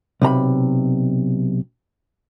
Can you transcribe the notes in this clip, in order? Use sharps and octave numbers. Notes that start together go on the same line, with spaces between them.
B1 C3 A#5 B5